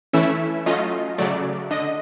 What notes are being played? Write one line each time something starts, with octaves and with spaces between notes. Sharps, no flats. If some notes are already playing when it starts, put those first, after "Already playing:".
E3 A3 C#4 E4 E5
F#3 A3 C#4 F4 D#5
C#3 F#3 A3 D5
D3 D#5